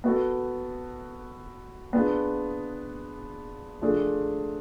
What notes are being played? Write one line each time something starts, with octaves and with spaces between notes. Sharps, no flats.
B3 F#4 A4
B3 D4 F4 G#4
F3 A3 D4 F4 G#4